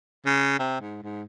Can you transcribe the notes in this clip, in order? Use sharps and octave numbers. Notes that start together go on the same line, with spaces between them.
C#3
C3
G#2
G#2